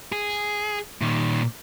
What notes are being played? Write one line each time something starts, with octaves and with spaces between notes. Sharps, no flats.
G#4
A#2 D#3